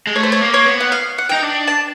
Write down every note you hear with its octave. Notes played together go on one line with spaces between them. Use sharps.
G#3
A3 C#5
C5
C#5
A#3
C#5
B3
F#5
F5
F#5
D#4 G5
D4
A5